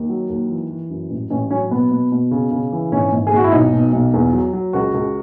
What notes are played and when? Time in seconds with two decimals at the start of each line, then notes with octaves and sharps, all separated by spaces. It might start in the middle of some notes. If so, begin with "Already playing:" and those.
Already playing: D#2
0.10 F#3
0.30 D#2
0.49 E3
0.70 E3
0.90 F#2
1.10 A1
1.30 A1 C#4
1.50 F#3 C#4
1.70 B2 B3
1.91 B2
2.12 B2
2.31 C#3
2.51 C#3
2.72 E3
2.92 G#1 C#4
3.12 G#1
3.27 G#4
3.32 G#1 F#4
3.44 E4
3.52 B1 D#4
3.73 B2
3.93 B1
4.14 E2
4.33 F#3
4.53 F#3
4.73 C#2 F#4
4.94 C#2